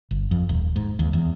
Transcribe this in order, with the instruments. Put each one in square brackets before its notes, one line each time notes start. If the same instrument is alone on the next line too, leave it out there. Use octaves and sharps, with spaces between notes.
[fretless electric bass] G1
F2
D#1
G#2
D#2
E2